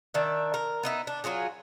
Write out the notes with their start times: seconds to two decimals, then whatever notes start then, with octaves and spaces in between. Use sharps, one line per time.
0.14 D#3 D4 E5
0.54 A#4
0.83 B3 D#4 E4
1.07 D4
1.24 F#3 F4 F#4 G#4